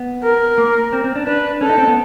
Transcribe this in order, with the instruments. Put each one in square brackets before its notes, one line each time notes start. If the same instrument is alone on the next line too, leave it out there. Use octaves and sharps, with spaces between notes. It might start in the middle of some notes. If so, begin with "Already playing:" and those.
Already playing: [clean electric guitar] B3
[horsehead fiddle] A#4
[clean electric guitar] A#3
C4
C4
D4
[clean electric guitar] D4 [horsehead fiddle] B4
[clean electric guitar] C#4 [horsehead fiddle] A4
[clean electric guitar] D#4
C4
B3